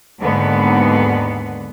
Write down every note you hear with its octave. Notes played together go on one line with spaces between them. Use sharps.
D#2 G#2 D3 B3